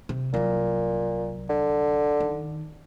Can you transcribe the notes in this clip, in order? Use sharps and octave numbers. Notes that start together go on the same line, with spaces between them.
C3
C2 A#2 F#3
D3
D#3